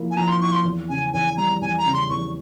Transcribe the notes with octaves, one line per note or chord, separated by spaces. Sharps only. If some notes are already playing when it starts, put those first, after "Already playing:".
Already playing: F3 A#3 E4 A#4
G#5
F3 A#5
C6
E4 C#6
C6
E2
C#3 G#5
E2 G#5
G3 A#5
E2 G#5
A#5
C#3
C6
E2 C#6